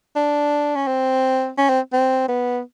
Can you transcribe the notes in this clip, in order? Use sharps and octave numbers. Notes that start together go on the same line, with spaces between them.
D4
C#4
C4
C#4
C4
C4
B3